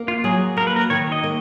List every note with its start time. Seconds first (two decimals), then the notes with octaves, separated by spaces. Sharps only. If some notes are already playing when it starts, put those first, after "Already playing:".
Already playing: A#3
0.08 F4
0.24 F#3 G#4
0.57 A#3 A#4
0.67 B4
0.76 A#4
0.90 D#3 C#5
1.12 D#5
1.23 A#3